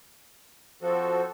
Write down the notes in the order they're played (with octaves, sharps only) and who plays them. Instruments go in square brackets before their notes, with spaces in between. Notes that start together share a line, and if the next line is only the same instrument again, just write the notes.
[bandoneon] F3 [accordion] C4 F#4 A4